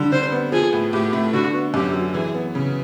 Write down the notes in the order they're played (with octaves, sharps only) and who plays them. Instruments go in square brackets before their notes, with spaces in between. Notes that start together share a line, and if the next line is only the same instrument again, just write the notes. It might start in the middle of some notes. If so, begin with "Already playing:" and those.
Already playing: [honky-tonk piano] D3 G3
[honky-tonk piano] D3 [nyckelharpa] C5
[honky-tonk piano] B3
[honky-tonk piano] F3 [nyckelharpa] G#4
[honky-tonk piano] A2
[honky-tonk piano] A2 [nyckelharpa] G4
[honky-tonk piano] A3
[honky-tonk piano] D3 [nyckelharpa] F#4
[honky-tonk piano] B3
[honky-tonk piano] F#2 [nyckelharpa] G4
[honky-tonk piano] F#3
[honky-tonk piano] E3 [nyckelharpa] G#4
[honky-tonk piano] B3
C#3